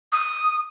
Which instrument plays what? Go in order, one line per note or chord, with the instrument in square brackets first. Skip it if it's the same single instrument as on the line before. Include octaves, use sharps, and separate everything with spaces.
[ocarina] D#6